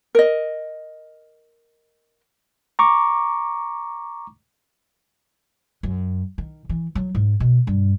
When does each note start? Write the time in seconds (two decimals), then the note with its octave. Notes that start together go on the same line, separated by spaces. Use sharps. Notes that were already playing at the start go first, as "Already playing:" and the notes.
0.15 A#4 D#5
2.79 A#5 C#6 D6
5.83 F#2
6.38 D#3
6.69 E3
6.95 F#3
7.15 G#2
7.40 B2
7.67 G2